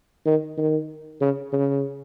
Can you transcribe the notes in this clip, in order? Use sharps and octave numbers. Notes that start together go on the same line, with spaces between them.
D#3
D#3
C#3
C#3